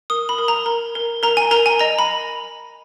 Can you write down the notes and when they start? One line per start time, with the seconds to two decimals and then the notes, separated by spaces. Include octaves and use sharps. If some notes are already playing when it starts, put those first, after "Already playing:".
0.10 A#4 D#6
0.29 B5
0.39 A#4
0.48 A#5
0.66 A#4
0.95 A#4
1.23 A#4 A#5
1.37 G#5
1.51 A#4 A#5
1.66 G#5
1.79 D#5 A#5
1.99 B5